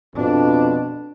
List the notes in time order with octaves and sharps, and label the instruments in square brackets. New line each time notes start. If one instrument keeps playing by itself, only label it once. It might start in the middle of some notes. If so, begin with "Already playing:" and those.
[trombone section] F2 B2 [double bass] D4